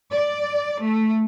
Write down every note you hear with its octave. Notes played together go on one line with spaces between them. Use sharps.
D5
A3